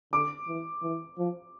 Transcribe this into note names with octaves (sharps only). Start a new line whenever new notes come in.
D3 D6
E3
E3
F3